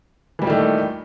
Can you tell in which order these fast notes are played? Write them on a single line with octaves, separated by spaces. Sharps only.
E3 G3 A#2 D#3 A3